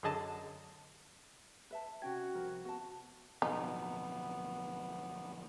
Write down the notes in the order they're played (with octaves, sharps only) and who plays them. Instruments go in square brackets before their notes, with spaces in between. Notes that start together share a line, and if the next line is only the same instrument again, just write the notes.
[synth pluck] F#2 D3 G#4 D#5 A5
[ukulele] B4 E5 A5
[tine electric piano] C3 C#4 G#6 [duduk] F#4 [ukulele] G5
[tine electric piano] C2 C3 F3 [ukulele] A#4
[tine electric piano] B3 [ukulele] F#4 A5
[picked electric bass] D1 F2 B2 [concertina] B3 [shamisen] D#4